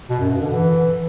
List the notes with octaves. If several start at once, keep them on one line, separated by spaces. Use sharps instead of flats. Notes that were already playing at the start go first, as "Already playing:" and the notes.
B2
F#2
G2
D3
E3